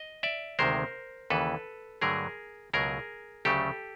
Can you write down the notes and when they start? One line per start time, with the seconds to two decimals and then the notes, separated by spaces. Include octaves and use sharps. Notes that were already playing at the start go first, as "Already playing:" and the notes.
Already playing: D#5
0.23 D5 E5
0.59 D2 C3 D#3 G#3 A#4 C5
1.30 D#2 C#3 E3 A4 B4
2.02 G2 D3 F#3 A3 G#4 A#4
2.73 C#2 B2 F#3 G#4 A#4
3.45 D2 C#3 F#3 A3 G4 A4